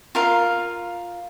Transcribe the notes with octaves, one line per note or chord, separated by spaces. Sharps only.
F4 A#4 F5